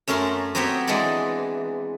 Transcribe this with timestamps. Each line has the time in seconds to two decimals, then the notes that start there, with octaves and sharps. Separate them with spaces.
0.08 F#2 A3 C#4 A#4 C6
0.55 F#3 B3 C4 G4 C#5 E5
0.87 E3 G#3 D4 D#4 D5